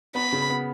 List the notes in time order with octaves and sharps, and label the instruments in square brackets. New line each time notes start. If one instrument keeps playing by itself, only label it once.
[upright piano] B3 [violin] B5
[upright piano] C#3
B3